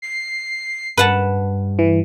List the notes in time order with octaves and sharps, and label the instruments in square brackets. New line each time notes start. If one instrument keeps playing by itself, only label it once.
[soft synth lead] C7
[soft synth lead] G2 [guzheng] B4 F#5 A5
[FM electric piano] E3